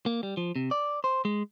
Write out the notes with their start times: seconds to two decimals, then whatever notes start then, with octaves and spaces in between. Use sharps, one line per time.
0.06 A#3
0.23 G3
0.37 F3
0.56 C3
0.71 D5
1.04 C5
1.25 G#3